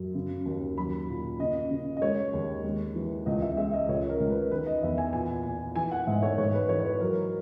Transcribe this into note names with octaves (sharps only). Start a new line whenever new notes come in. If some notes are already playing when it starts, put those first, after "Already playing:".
Already playing: F#2
C#3
D#2
F#3 B5
A#2
C#3 D#5
C#3
D#5
G#3 C#5
D#2
G#3
E3
C#2 D#5
E5
G#3 E5
D#5
C#2 C#5
A#4
C#2
B4
D#3 B4
D#5
E2 E5
G#5
A#2 G#5
A#2
E3 G#5
F#5
G#2 E5
C#5
G#2 C#5
B4
E3 C#5
C#5
B4
F#3 A#4